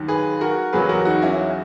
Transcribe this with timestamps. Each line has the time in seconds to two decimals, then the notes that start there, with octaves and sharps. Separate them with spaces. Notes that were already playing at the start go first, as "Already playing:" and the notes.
Already playing: D#2 D#3 F#3
0.08 G#4 B4
0.41 F#4 A#4
0.73 E2 C#3 F#3 G#4 B4
0.89 F#4 A#4
1.05 D#4 F#4
1.22 C#4 E4